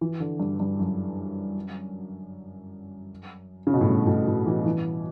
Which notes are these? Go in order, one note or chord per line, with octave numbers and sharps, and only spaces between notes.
E3
D3
G2
G2
F#2
C#3
B2
A2
G2
A2
A2
E3
E3